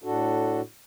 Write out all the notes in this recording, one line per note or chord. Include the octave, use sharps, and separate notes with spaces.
A2 D4 F#4 A4